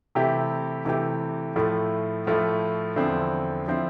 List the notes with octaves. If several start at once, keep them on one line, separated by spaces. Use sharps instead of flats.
C3 E3 A3 E4 G4
C3 E3 A3 E4 G4
A2 F3 A3 E4
A2 F3 A3 E4
E2 D3 F3 C4 E4
D3 F3 C4 E4